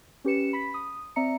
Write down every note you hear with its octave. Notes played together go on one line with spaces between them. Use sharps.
C#4 G4 B4 C#7 E7
B5 B6
D#6
C4 D5 E5 A#5 C#7